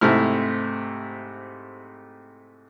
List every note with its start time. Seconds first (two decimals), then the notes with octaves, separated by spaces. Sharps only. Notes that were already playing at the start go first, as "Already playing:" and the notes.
0.01 G#2 C3 A3 C4 E4 F6